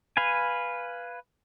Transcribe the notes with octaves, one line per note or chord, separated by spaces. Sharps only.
B4 F5 G#5